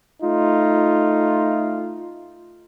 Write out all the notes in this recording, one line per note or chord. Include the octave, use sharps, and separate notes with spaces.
A3 D#4 F4